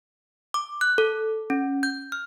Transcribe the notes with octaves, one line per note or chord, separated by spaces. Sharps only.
D6
F#6
A4
C#4
G6
F6